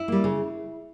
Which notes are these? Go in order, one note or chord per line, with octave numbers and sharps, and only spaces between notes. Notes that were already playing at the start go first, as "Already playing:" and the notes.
Already playing: E4
G3 A#3
C#3